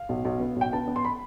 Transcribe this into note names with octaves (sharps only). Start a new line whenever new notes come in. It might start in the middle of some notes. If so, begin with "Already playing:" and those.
Already playing: F5
B1
B1
B3
B1
G5
B3 A5
B3
C6
B5